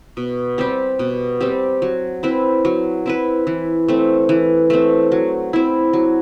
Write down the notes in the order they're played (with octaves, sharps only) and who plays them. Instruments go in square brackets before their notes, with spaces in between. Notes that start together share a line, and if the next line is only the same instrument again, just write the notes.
[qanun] B2
G3 C4 G4
B2
G3 C4 G4
F#3
C4 E4 B4
F#3
C4 E4 B4
E3
A3 C4
E3
A3 C4
F#3
C4 E4
F#3